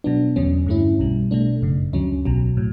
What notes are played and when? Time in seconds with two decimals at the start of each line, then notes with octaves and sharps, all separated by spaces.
0.04 B2 F#3 B3 D4
0.36 E2 D3 F#3 C#4
0.67 G2 D3 A3 C#4 E4
0.99 B1 B2 G3
1.31 B2 A3 D4
1.62 G1 F#2 C#3
1.93 D2 D3 F#3 C#4
2.25 B1 B2 F#3
2.57 A2 F#3